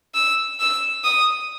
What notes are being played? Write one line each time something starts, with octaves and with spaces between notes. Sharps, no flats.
E6
E6
D#6